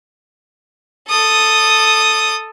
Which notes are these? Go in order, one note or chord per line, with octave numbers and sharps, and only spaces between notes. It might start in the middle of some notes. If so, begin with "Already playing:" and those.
A4 D#6